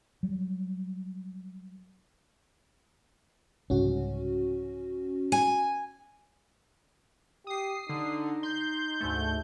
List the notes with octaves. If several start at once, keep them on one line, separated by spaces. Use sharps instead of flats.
F#3 G3
C2 G#2 C#3 C#4 F#4
G#5
G4 D#6 C7
D3 D#4
C6 G6
D2 G#2 A3